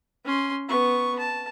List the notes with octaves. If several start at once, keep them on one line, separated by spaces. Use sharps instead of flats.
C#4 C6
B3 C#6
A5